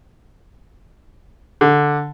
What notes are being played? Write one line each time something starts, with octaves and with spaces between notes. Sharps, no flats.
D3